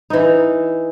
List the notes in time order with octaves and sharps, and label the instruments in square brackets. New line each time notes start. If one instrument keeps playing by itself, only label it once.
[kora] E3 D#4